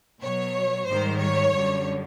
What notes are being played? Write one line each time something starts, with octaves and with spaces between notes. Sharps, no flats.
B2 F#3 C#5
G#2 D#3 G3 C5
C#5
F#2 D3 G3